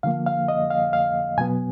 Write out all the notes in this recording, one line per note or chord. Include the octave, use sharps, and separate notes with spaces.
D3 F3 A#3 F5
F5
D#5
F5
F5
B2 F#3 B3 G#5